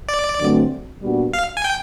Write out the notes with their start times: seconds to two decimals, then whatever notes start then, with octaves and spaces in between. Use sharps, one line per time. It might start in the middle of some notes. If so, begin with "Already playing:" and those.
0.08 D5
0.40 G2 D3 F#3 A3 C4
1.02 A#2 G3 B3 D4 F#4
1.33 F5
1.57 G#5
1.64 G5